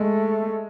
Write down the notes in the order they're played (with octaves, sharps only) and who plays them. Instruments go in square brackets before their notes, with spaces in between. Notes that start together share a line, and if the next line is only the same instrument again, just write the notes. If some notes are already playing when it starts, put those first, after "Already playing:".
Already playing: [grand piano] G#3 [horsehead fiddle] A3